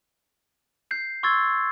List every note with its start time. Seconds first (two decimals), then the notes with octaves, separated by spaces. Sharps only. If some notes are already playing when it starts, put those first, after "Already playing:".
0.91 G6 C7
1.23 C6 C#6 E6 G#6 A6